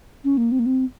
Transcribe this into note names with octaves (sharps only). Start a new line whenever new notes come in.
C#4
A#3
C4
A#3
C4